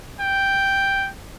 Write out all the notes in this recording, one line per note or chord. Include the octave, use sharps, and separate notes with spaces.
G5